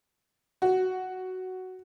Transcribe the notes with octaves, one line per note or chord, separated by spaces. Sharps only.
F#4